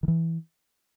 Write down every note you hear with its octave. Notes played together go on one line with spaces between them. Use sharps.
D#3
E3